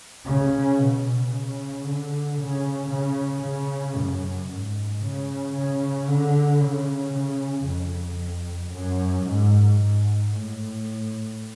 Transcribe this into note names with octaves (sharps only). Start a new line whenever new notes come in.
C#3
B2
C#3
D3
C#3
C#3
C#3
F#2
G#2
C#3
C#3
D3
C#3
C#3
F2
F#2
G#2
G#2
A2